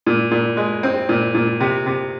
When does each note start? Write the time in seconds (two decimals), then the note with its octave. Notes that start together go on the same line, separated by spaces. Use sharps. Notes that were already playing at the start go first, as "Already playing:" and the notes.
0.06 A#2
0.31 A#2
0.57 G#3
0.83 C4
1.09 A#2
1.35 A#2
1.60 C3
1.86 C3